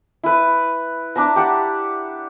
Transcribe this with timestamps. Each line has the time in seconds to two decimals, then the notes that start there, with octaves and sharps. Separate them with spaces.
0.23 E4 B4
1.15 D4 E5 A5 A#5
1.36 G4 F#5 A5